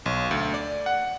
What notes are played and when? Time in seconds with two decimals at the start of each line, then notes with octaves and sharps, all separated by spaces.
0.06 B1
0.31 D2
0.54 D5
0.86 F#5